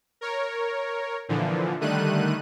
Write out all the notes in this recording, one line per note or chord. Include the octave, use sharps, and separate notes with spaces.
A#4 C#5
A#2 D3 E3 F3
D3 D#3 G3 A3 F#6 D#7